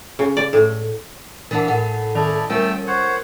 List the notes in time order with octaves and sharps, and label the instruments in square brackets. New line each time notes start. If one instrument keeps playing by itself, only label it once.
[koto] C#3
D5
A2
[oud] E3 D4 [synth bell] A#4 F#5
[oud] A2 [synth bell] A#4 F#5
[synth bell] D#3 A5 F7 [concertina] E4 D5 D#5
[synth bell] G3 A#4 [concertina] A3 G5 E6 [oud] C#4
[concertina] C5 C#5 F#5